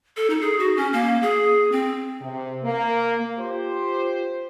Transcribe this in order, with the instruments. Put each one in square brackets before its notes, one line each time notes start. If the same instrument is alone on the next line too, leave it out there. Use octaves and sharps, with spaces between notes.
[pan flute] A4
D#4
G#4
F#4
C#4
A#3
G#4
C4
[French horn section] C3
A#3
[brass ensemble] F4 G4 C5